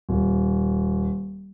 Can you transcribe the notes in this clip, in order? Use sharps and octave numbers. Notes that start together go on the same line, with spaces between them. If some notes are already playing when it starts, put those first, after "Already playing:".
D#1